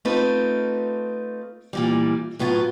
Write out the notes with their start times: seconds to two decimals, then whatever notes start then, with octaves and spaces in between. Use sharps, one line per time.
0.05 A3 C4 D#4 F4 B4
1.73 A#2 E3 G3
2.39 A2 F#3 B3 F4